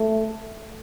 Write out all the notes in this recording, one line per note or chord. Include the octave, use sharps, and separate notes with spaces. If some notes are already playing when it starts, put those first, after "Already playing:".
Already playing: A3